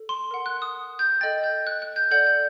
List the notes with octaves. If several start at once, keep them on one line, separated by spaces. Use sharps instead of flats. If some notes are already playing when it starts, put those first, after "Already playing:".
Already playing: A4
C6
A#4 F#5
F#6
D#6
G6
A4 D#5 G5 A6
G6
F#6
F#6
G6
A4 D5 F#5 G6
G6